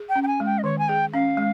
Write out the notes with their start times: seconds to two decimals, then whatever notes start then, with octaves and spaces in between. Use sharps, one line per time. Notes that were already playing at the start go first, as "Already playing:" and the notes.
Already playing: G#4
0.09 G5
0.15 C#4
0.23 G5
0.27 G#5
0.40 G#3
0.46 G5
0.58 D#5
0.64 D#3 C#5
0.79 G#5
0.88 G#4 G5
1.13 C#4 F5
1.37 G#3